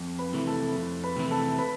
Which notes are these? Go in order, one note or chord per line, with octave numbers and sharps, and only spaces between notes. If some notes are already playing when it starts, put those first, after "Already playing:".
Already playing: F2
B4 B5
C3 E3 A3 E4
A4 A5
F2
B4 B5
C3 E3 A3 E4
A4 A5
B4 B5